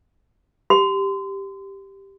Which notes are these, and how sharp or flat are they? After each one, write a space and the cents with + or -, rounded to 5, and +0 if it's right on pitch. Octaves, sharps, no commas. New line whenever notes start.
G4 +0 C6 -30